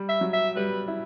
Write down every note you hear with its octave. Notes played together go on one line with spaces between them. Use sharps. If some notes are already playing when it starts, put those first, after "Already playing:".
Already playing: G3
E5
F#3
E5
G3 B4
E4